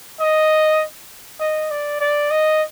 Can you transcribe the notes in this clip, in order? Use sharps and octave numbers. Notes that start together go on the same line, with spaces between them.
D#5
D#5
D5
D5
D#5